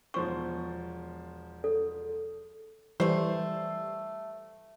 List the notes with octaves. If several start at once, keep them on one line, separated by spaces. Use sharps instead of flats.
E1 F3 C5 C#6
A4
E3 G3 A3 C5